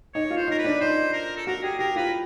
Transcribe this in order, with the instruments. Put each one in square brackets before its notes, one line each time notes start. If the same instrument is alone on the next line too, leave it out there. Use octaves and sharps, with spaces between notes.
[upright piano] D#4 [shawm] C#5
[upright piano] F4
[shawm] C5
[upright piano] D#4
[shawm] A#4
B4
[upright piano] D4
[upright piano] D#4 [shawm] C5
[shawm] A#4
A4
[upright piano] F#4 [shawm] A#4
[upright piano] G4 [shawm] G#4
[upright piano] G4 [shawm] A#4
[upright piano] F4 [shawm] B4